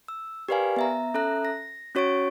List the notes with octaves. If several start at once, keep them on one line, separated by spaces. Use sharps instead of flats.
E6
G4 A#4 B4 D5 F5 G#5
B3 E5 A#5
C#4 A4 E5 A#5 F#6
A#6
C#4 F#4 C#5 C#6 A6 D7